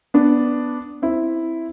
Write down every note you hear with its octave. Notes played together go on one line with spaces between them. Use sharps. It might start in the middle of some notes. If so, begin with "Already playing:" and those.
B3 D4
C4 E4